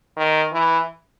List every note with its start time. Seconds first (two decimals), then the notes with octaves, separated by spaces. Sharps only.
0.17 D#3
0.53 E3